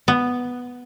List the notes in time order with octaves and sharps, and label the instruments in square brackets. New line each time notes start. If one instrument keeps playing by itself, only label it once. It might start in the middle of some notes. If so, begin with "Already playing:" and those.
[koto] B3